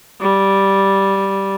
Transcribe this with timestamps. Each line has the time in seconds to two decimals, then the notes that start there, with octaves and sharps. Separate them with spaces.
0.21 G3